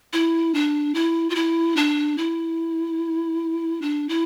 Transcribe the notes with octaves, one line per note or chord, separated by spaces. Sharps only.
E4
D4
E4
F4
E4
D4
E4
D4
E4